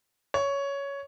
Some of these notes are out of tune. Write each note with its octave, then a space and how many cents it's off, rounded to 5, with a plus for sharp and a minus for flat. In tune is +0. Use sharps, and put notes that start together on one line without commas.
C#5 +10